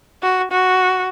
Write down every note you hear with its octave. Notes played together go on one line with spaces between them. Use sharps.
F#4
F#4